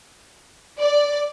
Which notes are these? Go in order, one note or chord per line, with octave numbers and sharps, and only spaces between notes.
D5